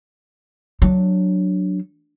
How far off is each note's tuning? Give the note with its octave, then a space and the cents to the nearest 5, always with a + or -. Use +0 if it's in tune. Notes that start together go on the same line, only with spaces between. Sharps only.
F#3 +0 D4 +0